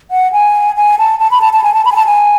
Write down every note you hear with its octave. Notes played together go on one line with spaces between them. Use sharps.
F#5
G#5
G#5
A5
A5
B5
A5
A5
G#5
A5
B5
G#5
A5
G#5